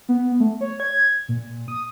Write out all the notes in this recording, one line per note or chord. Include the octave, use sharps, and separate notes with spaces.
B3
A3
C#5
G#6
A#2
D#6